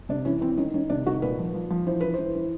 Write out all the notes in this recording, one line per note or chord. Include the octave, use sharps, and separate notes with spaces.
C3 D4
E3 C#4
E3 C4
D#3 C#4
D#3 C#4
C3 D4
D#3 F#4
A#2 B4
F3
F3
F3
E3 C5
E3 B4
E3 C5
E3